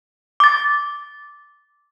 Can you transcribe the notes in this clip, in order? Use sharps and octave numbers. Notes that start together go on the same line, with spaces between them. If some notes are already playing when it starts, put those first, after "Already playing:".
D6 A6